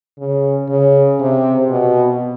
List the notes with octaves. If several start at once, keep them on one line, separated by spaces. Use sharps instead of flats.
C#3
C#3
C3
B2